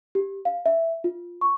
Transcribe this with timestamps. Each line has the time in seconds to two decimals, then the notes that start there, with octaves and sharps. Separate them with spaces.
0.15 G4
0.45 F5
0.66 E5
1.04 F4
1.41 C#6